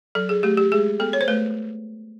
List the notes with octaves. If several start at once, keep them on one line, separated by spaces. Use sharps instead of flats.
F#3 A4
G#4
A3 G4
G4
G#3 G#4
B3 A4
C#5
C5
A3 B4